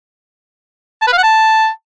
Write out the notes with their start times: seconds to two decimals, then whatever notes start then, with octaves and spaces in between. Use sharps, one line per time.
1.02 A5
1.07 B4
1.12 F5
1.18 F#5
1.23 A5